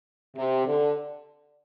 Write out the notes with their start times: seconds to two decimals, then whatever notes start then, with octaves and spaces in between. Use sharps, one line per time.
0.36 C3
0.66 D3